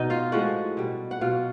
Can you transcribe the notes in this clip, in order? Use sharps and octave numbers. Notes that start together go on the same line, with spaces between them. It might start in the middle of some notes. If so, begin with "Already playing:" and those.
Already playing: B2 D#4 D#5
F4 F5
A2 F3 G#3 F#4 F#5
B2 G3
F#5
B2 F#3 F4 F5